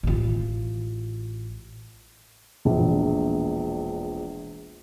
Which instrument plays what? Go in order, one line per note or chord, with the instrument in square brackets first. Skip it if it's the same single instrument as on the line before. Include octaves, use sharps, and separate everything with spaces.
[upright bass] A1 F4
[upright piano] E1 A#1